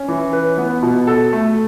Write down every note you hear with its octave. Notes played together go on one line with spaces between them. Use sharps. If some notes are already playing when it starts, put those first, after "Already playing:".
Already playing: C#4
E3
B4
B3
B2
A4
A3